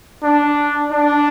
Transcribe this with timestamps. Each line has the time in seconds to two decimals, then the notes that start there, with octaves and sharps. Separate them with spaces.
0.23 D4
0.92 D4